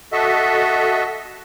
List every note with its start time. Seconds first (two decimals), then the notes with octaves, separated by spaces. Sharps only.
0.12 F#4 A4 D#5 E5